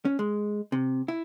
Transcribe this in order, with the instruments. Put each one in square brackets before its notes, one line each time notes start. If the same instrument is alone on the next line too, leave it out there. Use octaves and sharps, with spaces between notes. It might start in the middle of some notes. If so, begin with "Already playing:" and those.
[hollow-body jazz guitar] C#4
G#3
C3
E4